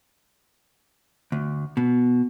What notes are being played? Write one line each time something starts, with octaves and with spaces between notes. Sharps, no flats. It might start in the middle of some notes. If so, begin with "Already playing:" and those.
D2
B2